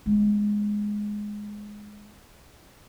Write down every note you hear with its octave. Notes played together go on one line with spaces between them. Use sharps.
G#3 B3